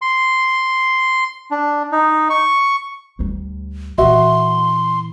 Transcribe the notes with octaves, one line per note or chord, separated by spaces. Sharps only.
C6
D4
D#4
C#6
D2 G3
A#2 E3 F#4 E5 C6